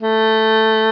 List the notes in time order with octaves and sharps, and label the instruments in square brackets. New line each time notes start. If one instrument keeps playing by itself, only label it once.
[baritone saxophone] A3